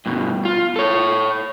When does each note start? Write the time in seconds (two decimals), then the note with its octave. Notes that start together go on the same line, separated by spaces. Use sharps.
0.06 G2 B2
0.45 F4
0.76 A4 C#5